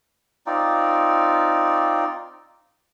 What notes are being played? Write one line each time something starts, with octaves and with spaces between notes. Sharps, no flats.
C4 D#4 F4 D5